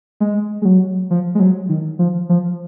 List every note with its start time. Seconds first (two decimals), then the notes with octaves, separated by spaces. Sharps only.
0.20 G#3
0.62 G#3
0.65 F#3
1.10 F3
1.35 G#3
1.40 F#3
1.69 D#3
1.99 F3
2.29 F3